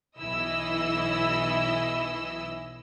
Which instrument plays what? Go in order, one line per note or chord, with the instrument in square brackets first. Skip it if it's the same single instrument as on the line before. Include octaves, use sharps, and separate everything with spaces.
[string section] B1 E3 E4 D#5 E6